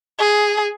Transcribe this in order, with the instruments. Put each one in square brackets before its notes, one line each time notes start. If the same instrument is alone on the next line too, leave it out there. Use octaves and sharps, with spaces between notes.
[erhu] G#4